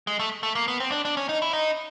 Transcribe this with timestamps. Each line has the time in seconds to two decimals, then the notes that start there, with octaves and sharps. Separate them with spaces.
0.07 G#3
0.19 A3
0.43 A3
0.55 A#3
0.68 B3
0.80 C4
0.92 D4
1.05 D4
1.17 C#4
1.29 D#4
1.42 E4
1.53 D#4